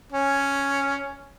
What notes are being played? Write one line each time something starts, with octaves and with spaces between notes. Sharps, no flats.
C#4